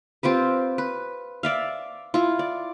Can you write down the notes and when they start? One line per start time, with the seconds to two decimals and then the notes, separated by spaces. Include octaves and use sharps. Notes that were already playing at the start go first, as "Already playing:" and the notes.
0.23 C4 F4 G4 B4
0.78 B4
1.43 D5 E5 F5
2.14 E4 F4
2.39 D5